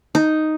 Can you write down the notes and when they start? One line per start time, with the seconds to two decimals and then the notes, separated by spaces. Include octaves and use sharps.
0.15 D#4